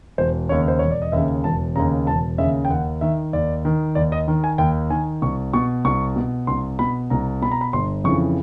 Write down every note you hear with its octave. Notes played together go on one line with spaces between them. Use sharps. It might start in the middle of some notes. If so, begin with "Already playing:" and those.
E1 C5
D#2 C#3 C#5
C5
E1 C#5
D5
D#5
D#2 C#3 E5
E1 A5
D#2 C#3 A#5
E1 A5
D#2 C#3 E5
G5
D#2 F#5
D#3 E5
D#2 D5
D#3
D#2 D5
D#5
D#3
G#5
D#2 G5
D#3 G#5
C2 C#6
B2 C#6
C2 C#6
B2
C2 C6
B2 B5
C2 A#5
B2 B5
A#5
B5
G1 C6
F2 C#3 E3 C#6